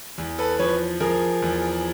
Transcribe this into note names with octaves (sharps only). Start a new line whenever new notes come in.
E2
A4 B4
F3 B4 C#5
F3 G#4 A#4
E2